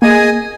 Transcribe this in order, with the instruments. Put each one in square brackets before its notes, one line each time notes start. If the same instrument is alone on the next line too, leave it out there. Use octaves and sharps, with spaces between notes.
[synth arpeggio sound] A#3 [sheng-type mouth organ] G#4 D#5 G#5